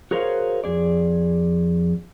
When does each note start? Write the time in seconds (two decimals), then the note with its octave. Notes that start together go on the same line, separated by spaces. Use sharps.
0.11 F#4 G#4 A#4 C5 C#5 F5
0.64 F2 G#4 D5